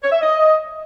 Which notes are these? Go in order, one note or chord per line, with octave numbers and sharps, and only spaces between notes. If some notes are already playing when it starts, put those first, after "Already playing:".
C#5
E5
D#5